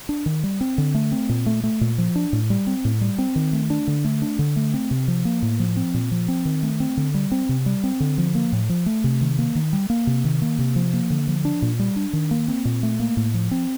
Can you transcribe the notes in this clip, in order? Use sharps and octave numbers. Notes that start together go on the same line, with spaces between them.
D4
D#3
G3
C4
D3
A3
C4
A#2
A3
A3
A#2
F3
D4
A2
G3
C4
A2
G3
C4
D#3
A3
D4
D3
A3
D4
D3
A3
C4
C3
F3
A#3
A2
F3
C4
A#2
F3
C4
D#3
A3
C4
D3
G3
C4
C3
G3
C4
D3
F3
A#3
A2
F3
A3
C3
D#3
A#3
D#3
G3
A#3
C3
D#3
A#3
C3
F3
A#3
D3
F3
D4
A#2
G3
D4
D#3
A#3
C4
A#2
A3
A#3
A2
F3
C4